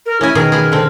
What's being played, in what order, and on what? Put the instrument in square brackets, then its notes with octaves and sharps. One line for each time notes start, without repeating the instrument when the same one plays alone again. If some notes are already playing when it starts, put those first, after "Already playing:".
[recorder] A#4
[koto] C#4 D#5 G#5 [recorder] E4
[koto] B2 D#3 G#4 [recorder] A#4
[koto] G#4 B4
D3 C4